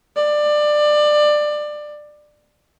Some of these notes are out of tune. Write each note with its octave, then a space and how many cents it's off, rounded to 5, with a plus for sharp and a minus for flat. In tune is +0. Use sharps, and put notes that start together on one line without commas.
D5 +20